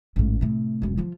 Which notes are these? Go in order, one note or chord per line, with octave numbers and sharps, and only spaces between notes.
A1 G#2
A2 C3
E1 F#2
F3 F4